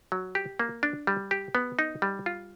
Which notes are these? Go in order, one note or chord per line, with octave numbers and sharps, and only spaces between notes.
F#3
G4
A#3
D4
G3
G4
B3
D#4
G3
F4